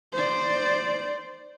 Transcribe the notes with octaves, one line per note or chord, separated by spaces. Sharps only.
C5 D5